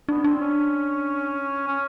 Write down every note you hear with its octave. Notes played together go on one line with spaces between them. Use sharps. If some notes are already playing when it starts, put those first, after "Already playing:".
B3 D4
C4 D4
C#4
C#4